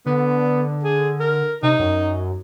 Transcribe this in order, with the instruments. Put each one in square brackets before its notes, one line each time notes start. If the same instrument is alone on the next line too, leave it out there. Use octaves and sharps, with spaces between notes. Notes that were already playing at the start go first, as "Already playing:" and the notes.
[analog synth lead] D3 [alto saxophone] B3
[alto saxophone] G#4
A#4
[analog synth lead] C3 [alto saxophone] D#4
[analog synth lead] F#2